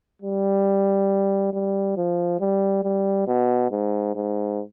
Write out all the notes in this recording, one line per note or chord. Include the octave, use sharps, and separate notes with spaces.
G3
G3
F3
G3
G3
B2
G#2
G#2